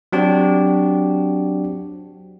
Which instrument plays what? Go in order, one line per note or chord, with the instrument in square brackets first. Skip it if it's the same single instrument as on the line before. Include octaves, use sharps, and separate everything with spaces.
[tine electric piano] F#3 C4 D4 F#4 G4